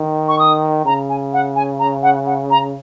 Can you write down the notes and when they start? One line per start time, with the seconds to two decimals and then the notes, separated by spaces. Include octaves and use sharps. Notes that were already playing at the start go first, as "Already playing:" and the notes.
Already playing: D#3
0.28 C#6
0.39 D#6
0.85 C#3 A#5
1.09 G#5
1.33 F#5
1.55 G#5
1.79 A#5
2.03 F#5
2.26 F#5
2.50 A#5